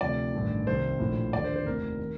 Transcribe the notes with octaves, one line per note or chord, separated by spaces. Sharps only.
D2 C3 F3 D5
A1 G2 D#3
C2 C3 D#3 C5
A#1 A2 F3
D#2 D3 F3 D5
C5
C5
F1 D#2 D#3 A#4
D#3